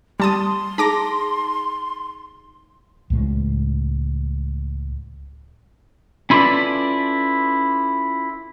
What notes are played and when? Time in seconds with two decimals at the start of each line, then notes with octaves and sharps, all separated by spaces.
0.20 G3 A5 C6 D#6
0.78 D#4 G#4 A#5 D6 A#6
3.10 C#2 A2 G#3
6.30 C#4 E4 F4 A4 B4 D5